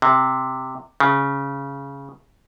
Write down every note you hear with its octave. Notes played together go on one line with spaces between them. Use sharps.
C3
C#3